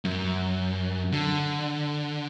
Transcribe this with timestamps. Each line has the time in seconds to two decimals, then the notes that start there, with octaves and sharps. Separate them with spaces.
0.05 F#2
1.12 D3